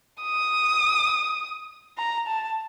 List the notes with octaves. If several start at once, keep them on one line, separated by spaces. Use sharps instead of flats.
D#6
A#5
A5